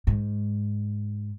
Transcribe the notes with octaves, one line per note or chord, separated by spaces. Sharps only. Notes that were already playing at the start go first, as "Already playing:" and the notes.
G#2